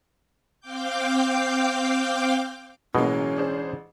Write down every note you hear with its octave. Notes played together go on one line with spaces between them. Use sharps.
C4 F5 G5 D6 G6
A1 B2 E3 F#3 G#3 A#3 C#4
D4 G#4 C5